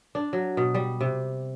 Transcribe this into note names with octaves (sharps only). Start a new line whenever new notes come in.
D4
F#3
B2
G3
C3